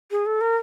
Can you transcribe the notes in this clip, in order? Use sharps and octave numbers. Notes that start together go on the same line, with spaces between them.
G#4
A4
A#4